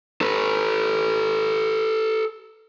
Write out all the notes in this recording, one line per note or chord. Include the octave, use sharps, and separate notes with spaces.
A4 B4